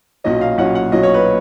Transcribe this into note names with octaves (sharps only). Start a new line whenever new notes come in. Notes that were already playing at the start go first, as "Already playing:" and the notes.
B1 A#2 F#3 C#4 D#5
F5
B1 A#2 F#3 C#4 F#5
F#5
B1 A#2 F#3 C#4 D#5
C#5
B4